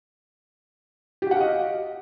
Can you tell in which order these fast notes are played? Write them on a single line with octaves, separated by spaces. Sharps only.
G4 F#4 F#5 F5 D#5